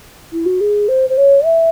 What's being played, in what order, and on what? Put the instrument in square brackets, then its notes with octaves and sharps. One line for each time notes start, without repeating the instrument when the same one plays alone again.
[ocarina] E4
F#4
G#4
C5
C5
C#5
E5